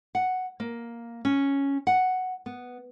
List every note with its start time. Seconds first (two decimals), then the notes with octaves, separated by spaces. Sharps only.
0.15 F#5
0.60 A#3
1.25 C#4
1.87 F#5
2.46 B3